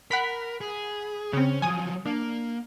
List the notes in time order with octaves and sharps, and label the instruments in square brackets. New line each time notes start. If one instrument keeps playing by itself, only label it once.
[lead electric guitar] A#4 [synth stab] F#5 B5 B6
[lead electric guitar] G#4
[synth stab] C#3 C4 [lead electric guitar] C#4
[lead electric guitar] F3 F#3 [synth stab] G#5 D#6
[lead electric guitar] A#3 [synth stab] D4